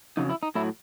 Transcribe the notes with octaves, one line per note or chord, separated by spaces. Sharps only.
F2 C#3 F#3 D#4
E4
D#4
A2 F#3 E4